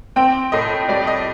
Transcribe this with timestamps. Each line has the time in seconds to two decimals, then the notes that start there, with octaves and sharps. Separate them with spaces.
0.16 C4 G5
0.52 A2 D#5
0.88 G3 D5
1.07 D#5